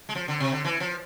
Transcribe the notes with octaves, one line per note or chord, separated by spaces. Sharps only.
G#3
F3
D3
C3
D3
E3
F3